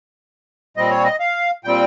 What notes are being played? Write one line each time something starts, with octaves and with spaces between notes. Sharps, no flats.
A#2 G3 C4 D#5
C#5
D#5
F5
A#2 G3 C4 G5